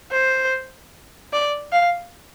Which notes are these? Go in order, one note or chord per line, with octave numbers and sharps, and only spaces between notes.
C5
D5
F5